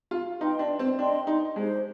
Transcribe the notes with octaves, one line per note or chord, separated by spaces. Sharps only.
F4
D#4 B4 D#5 G5 C6
D4
C4
D4 B4 D#5 G5 C6
D#4
G#3 D#4 G4 C5